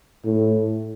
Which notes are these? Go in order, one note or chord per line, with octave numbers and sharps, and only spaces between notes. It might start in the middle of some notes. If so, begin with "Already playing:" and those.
A2